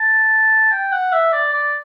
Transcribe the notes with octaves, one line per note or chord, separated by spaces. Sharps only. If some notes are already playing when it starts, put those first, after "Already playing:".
Already playing: A5
G5
F#5
E5
D5
D5